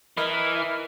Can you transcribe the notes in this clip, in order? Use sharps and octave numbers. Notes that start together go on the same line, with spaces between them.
E3 A#4 D#5 B5 F6